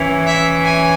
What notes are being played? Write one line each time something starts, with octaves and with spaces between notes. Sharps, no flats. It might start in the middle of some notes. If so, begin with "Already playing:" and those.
Already playing: E3 C#4
E5
G#5